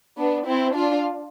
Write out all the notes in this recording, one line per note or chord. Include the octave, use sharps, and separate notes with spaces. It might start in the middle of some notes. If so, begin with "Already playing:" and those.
B3 D4
C4 E4
D4 F4